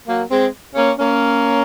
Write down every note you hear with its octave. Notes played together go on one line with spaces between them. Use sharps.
F#3 A#3
G#3 C4
A#3 C#4
A#3 C#4